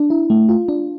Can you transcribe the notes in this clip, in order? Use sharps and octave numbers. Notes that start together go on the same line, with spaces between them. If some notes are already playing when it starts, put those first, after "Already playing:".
Already playing: D4
E4
A3
F4
D4